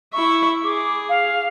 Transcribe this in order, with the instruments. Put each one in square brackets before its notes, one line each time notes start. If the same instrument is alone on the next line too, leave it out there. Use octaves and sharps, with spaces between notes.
[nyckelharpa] E4 E5 [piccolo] C#6
[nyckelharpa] G#4 [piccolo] D6
[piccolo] F5